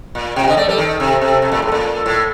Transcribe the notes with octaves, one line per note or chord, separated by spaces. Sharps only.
A#2
C3 G5
D3 D#5
A3 D5
G3 A4
D#3
C3
C3
C3
A#2
A2 A4
A#2
A2